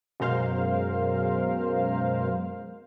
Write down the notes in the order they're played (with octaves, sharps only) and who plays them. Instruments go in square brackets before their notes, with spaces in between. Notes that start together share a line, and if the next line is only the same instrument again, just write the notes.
[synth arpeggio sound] F#2 B2 G#3 A#4 C5 F5